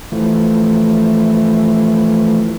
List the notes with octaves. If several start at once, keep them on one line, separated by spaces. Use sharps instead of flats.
E3 F3 A3